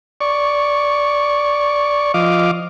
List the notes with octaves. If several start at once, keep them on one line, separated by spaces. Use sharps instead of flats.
D5 C#6
F3 D#5 F5 D6